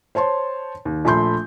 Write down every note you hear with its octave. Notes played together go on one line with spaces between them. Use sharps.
C5 C#5 A5 C6
D#2
A#1 A3 B5 C6 G6